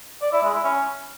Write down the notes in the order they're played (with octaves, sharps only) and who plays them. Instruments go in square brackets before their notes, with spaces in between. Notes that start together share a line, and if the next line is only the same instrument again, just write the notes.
[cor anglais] D5
E4
G#3
E4
C#4